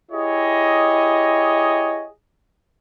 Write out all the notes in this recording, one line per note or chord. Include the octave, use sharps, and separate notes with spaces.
E4 G4 G#4 C#5 D#5